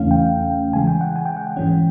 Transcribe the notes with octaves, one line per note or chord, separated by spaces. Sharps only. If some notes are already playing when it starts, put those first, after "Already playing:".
Already playing: E2 C#3 E3 A3 C#4 F5
G5
C#3 E3 G#3 G#5
G5
F#5
G#5
G5
F#5
G5
G#2 E3 G#3 C#4